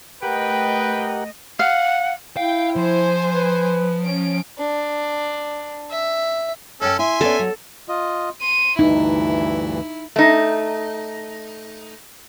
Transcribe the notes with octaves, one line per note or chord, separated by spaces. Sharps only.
A3 G4 A#4 B4 D#5 F#5 G5
F5 F#5
E4 F5 G5
F3 C5 G#5
B4
C#4 D7
D4
E5
F#2 C#4 A4 G5
E4 E5 G#5 C6
B3 C#4 A4 D5
F#3
F4 D#5
C6 D#7
D2 G2 E3 D#4 E4
A3 D#4